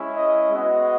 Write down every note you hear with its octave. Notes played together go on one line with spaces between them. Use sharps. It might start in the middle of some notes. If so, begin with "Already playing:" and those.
Already playing: G#3 C#4 E4
D#5
G#3 B3 F#4 D#5